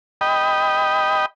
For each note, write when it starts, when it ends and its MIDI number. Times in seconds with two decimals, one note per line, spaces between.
0.21 1.26 75
0.21 1.26 79
0.21 1.26 83